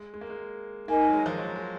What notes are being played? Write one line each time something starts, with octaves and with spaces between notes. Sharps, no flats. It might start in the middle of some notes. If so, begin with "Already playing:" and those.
Already playing: G#3
G#3
A#3
G#3
A#3 D#4 A#4 D#5 G#5
F#3
G#3
F3
F#3
G#3